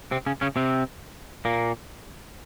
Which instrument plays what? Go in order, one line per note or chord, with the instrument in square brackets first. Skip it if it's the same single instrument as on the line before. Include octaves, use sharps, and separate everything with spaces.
[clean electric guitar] C3 C4
C#3 C#4
C#3 C#4
C3 C4
A#2 A#3